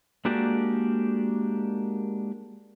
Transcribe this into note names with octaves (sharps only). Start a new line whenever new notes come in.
G#3 A#3 D4 F#4 G4 D5